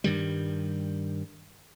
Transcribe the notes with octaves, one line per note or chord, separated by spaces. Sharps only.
G2 D#3 G3